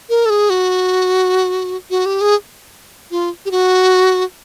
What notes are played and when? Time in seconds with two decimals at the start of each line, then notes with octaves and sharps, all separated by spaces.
0.09 A#4
0.25 A4
0.30 G#4
0.50 F#4
1.90 F#4
2.06 G4
2.21 G#4
3.11 F4
3.45 G4
3.51 F#4